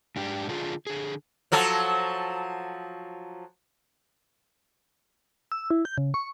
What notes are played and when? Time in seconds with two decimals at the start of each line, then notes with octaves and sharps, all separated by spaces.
0.16 G#2 D4 G4
0.49 D3 D4 F4 G#4
0.87 D3 G#4
1.52 F3 F#3 A4
5.52 E6
5.71 E4
5.85 G6
5.98 C#3
6.14 C#6